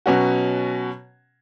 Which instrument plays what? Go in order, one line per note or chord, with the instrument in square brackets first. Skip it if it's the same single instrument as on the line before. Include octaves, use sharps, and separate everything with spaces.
[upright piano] B2 F#3 C#4 F#4